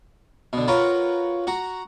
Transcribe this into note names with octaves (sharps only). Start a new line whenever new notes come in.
B2 D3
F4 F#4 A#4 B4 C#5
F#4 F#5 A#5